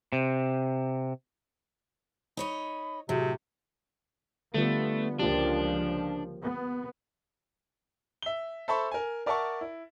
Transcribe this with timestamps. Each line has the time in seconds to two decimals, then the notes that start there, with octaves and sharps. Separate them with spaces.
0.13 C3
2.37 D#4 C#5 D#5 B5
3.09 A2 C3 F#3 G#4
4.54 D3 G3 A3 B3 F4
5.19 C#2 F3 A#3 D4 F4 G4
6.43 B3
8.22 E5 G7
8.68 A4 C5 E5 A5 B5 C#6
8.91 A#4 G#5
9.26 A#4 D5 E5 F#5 A5 C#6
9.61 E4